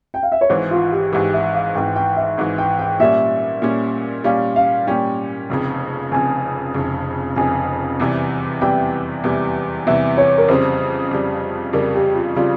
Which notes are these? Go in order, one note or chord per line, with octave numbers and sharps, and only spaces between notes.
G5
F5
E5
C#5
G#1 G#2 E3 C5
F4
G4
G#1 G#2 E3 G4
E5
F5
G#1 G#2 E3 G5
G5
E5
G#1 G#2 E3
G5
G5
A#2 G3 C#4 E5
A#2 G3 C#4
A#2 G3 C#4 F5
F5
A#2 G3 C#4 G5
F1 F2 C#3
F1 F2 C#3 G#5
F1 F2 C#3
F1 F2 C#3 G#5
E2 C3 E3 G3
E2 C3 E3 G3 G5
E2 C3 E3 G3
E2 C3 E3 G3 E5
C#5
A#4
F2 C#3 G3 C5
F2 C#3 G3
F2 C#3 G3 A#4
G4
F4
C#3 G3 F4